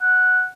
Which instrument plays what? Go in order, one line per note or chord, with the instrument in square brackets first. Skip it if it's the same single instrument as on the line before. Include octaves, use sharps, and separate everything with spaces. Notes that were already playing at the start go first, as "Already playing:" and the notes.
[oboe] F#5